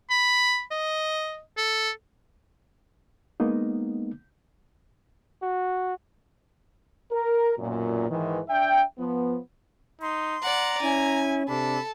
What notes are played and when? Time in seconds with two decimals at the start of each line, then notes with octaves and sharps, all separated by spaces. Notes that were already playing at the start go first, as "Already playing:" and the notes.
0.10 B5
0.71 D#5
1.57 A4
3.40 G#3 A#3 B3 D#4
5.42 F#4
7.12 A#4
7.59 B1 F#2 A#2
8.10 G#2 D#3 E3
8.49 D4 E5 G5
8.98 F3 B3
10.02 D#4 C6
10.43 D5 F#5 A#5
10.82 C#4 E4 G#5
11.49 C3 D4 A4 B5